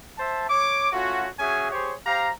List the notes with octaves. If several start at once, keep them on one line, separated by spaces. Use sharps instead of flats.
C5 E5 A5
C#5 D6
A3 C#4 F4 F#4
C#4 F#4 G#4 E5 G#5
G4 G#4 C5 C#5
G4 C5 F5 A#5